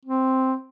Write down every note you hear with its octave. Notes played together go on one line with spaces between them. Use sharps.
C4